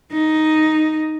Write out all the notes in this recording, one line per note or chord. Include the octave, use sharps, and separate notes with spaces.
D#4